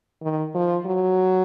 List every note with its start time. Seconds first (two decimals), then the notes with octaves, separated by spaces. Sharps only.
0.22 D#3
0.55 F3
0.86 F#3